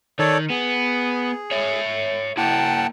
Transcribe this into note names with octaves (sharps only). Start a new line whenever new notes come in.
D#3 A4 C#5 D5
B3 G#4
C#5 E5
A#3 E4 F#5 G5 A5